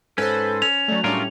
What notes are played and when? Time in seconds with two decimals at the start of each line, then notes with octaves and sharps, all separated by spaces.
0.18 G#2 C#4 A4 B4 C5
0.62 C#4 F7
0.88 F#3 A3 D5
1.04 A2 F#3 G3 C#4 D4 F4 A#4